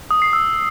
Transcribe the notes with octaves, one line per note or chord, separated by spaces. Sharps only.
D#6
C7
E6